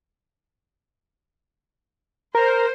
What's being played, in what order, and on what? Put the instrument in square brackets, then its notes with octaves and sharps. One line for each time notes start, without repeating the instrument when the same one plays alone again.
[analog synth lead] A#4 [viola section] C5